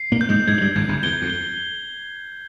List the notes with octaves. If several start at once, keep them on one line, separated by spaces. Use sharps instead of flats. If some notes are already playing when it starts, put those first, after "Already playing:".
Already playing: C7
A#2 A#3
G6
G#2 G#3
G#2 G#3 G#6
F3
G2 G3
G#1 G#2 G#6
G1 G2
E2 G7
F2
G7